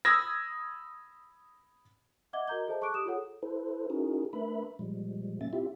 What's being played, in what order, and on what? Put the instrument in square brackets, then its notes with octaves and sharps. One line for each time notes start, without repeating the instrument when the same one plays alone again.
[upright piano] B5 D#6 E6 G#6 A#6
[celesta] D#5 E5 F#5 D6 G#6 G7
F#4 A#4 D#5 A#5 G6 G7
G#4 A4 C5 D#5 E5 A5
A5 C#6 D6 F#6 D7
G4 D#6 E7
F4 G#4 A4 C#5 F#5
[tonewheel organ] E4 A4 B4 C5
C#4 D#4 E4 F#4 G#4 A#4
A3 D4 A#4 B4 E5 B5
A#2 F3 G3 G#3
A#2 F#3 A#3 C#4 E5 A6
C4 E4 F4 G4 E5